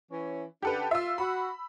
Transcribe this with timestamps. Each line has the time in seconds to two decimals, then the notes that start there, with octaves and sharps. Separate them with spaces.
0.11 E3 C#4
0.62 C#3 D4 G4 A4 B4 F#5
0.91 F4 E5 E6
1.18 F#4 B5